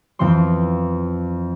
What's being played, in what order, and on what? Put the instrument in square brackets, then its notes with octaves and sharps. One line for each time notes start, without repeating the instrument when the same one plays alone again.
[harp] F2 E3 C4 C5 C6